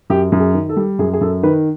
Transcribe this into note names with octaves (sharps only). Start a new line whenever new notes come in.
F#2 G4
F#2
G#4
D#3
A4
G3
F#2 G#4
G#4
F#2 A4
D#3 B4